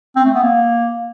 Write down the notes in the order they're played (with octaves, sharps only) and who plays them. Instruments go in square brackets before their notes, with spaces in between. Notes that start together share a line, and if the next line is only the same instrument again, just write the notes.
[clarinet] C4
A3
B3
A#3